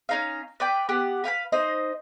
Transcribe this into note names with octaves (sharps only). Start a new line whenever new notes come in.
C#4 D#4 F5
B4 D5 G5
B3 G4 F#5
B4 F5 G5 B5
D#4 C5 D#5